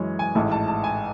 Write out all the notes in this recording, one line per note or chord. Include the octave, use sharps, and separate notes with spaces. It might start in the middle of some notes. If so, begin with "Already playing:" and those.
Already playing: F#2 E3 G#3 C#5
G#5
A1 G#2 E3 A3 A5
A5
A5
G#5